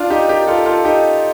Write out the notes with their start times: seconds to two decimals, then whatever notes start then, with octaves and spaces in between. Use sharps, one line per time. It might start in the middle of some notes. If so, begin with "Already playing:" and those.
Already playing: D4 F4
0.10 D#4 G4
0.29 G4 A#4
0.47 F4 A4
0.66 F4 A4
0.85 D#4 G4